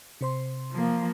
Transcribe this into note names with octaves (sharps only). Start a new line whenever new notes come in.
C3 C5 C6
F3 A#3